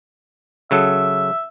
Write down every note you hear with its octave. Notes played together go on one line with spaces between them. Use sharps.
C#3 F#3 A4 E5